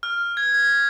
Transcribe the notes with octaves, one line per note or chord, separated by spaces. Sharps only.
F6
G#6
G#6